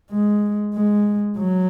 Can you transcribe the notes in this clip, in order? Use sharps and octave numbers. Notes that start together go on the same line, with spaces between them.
G#3
G#3
F#3